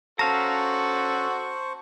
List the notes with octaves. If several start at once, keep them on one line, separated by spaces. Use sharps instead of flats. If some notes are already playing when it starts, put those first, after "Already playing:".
C#4 F#4 A4 C5 F5 A5 A#5 C#6